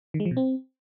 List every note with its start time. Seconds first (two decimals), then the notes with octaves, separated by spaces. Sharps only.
0.14 D#3
0.20 G#3
0.25 F3
0.31 B2
0.37 C4